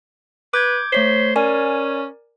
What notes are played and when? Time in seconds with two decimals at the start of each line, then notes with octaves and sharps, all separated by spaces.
0.54 B4 D6 G6 G#6
0.92 A3 C5 C#5 B6
1.36 C#4 A#4 D5 G#5